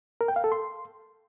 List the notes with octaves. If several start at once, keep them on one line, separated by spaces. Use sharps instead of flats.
A#4
G5
F5
A4
C6